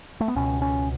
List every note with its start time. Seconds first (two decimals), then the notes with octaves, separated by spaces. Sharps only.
0.20 A3
0.28 B3
0.36 C#2 B2 C#4
0.62 C#4